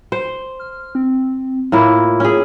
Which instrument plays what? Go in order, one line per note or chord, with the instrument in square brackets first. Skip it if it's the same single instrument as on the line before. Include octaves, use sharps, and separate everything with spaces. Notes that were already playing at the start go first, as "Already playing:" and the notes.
[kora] C5
[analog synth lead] F6
C4
[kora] A2 A#3 E4 [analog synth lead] F4
[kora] C#4 G#4